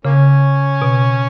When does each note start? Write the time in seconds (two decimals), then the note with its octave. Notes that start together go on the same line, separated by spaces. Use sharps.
0.05 C#3 A#3 C#4
0.82 B2